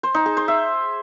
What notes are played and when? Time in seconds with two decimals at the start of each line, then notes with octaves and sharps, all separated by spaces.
0.03 C5
0.15 D#4
0.26 G#4
0.37 C5
0.48 E5